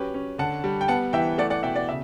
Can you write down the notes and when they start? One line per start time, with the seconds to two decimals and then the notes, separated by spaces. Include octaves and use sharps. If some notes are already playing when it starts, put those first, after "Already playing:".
Already playing: F#3 C#4 G4 B4
0.14 C#4
0.38 D3 F#5 A5
0.64 G3
0.81 G5
0.88 B3 F#5 A5
1.13 E3 E5 G5
1.38 A3 D5 F#5
1.50 D5 F#5
1.63 B2 E5 G5
1.76 D5 F#5
1.89 C#3 E5